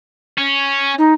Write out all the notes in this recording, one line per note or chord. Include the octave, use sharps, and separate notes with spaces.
C#4
D#4